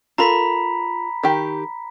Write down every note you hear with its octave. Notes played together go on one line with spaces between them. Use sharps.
F4 A4 A#4 A#5 B5 B6
D#3 G4